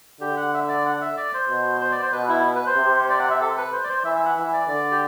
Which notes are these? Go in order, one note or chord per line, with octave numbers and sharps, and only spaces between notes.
D3 G4
F#5
E5
E5
D5
F#5
E5
D5
C5
B2
C5
D5
C5
B2 B4
E4
B4
C5
C3
C5
D5
F#5
E5
A4
B4
C5
D5
C5
E3 E5
E5
F#5
E3 E5
D5
D3 D5
G4